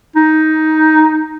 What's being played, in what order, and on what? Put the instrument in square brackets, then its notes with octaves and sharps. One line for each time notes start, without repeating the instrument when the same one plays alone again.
[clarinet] D#4